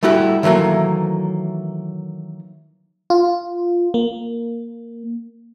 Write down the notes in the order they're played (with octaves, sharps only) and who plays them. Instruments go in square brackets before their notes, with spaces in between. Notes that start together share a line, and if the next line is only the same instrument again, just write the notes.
[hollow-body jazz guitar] G3 A3 E4 F#4 G4
D#3 E3 F#3 A3 A#3
[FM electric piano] F4
A#3